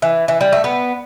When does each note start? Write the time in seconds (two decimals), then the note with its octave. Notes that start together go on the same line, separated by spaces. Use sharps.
0.02 E3
0.28 E3
0.41 G3
0.52 A3
0.64 B3